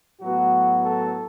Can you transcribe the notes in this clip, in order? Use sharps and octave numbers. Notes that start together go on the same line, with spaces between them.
A2 F#3 B3 F#4
A4